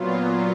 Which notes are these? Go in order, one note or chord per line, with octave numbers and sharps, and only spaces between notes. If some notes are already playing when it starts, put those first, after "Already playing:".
Already playing: A#2 F#3 B3 F4